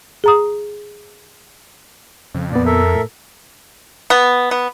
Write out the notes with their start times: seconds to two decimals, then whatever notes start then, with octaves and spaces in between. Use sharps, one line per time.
0.24 G#4 A#5 D#6
2.35 F2 C#3
2.52 A#2 B3 D5
2.65 A4 A#4 E5
2.95 A2
4.10 B3
4.51 B3